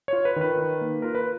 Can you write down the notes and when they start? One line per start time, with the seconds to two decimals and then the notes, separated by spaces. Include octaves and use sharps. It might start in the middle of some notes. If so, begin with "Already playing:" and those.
0.08 F4 C#5
0.25 B4
0.36 D#3 B4
0.58 D#3
0.81 A#3
1.02 F4 A#4
1.15 B4